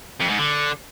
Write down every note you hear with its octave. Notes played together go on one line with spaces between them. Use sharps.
F2
G#2
D3